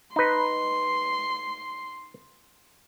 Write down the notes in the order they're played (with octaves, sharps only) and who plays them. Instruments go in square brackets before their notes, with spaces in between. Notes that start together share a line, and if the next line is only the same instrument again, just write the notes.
[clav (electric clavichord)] D#4 B4 [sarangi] C6